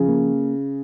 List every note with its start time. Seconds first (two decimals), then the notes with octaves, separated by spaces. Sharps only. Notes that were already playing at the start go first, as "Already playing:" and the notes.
Already playing: C#3 F3
0.08 A#3